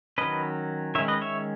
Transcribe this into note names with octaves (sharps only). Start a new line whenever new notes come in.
D#3 F#3 C#4 B4 D#5
D#3 G#3 C#4 C#5 E5
B4 D#5
C#5 E5